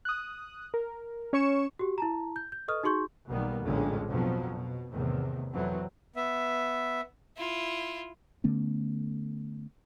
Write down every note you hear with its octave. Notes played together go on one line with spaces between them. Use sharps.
D#6 F#6
A#4
C#4 C#5 C#6 C#7 E7
F#4 G4
E4 A5 A#5
G6
G6
A4 B4 D#5 C#6 D#6 F6
D#4 F#4 G#4 C6 C#6 G6
B1 B2 D#3 G3 A#3 B3
A#1 F2 A2 D3 G#3 C#4
F2 B2 F3 F#3 B3
B2
E2 A2 C3 D#3
F2 E3 F#3 C4
B3 E5
E4 F4
D3 A3 B3 C#4